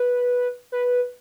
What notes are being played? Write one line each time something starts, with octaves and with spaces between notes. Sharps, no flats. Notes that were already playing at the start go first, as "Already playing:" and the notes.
Already playing: B4
B4